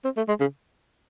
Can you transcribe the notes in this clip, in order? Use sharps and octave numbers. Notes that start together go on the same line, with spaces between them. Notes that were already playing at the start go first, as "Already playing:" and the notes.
C4
A3
G#3
C#3